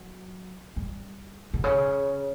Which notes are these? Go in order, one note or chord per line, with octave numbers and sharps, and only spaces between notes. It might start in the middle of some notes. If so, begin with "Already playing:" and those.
Already playing: F#3
G3
B2
C#3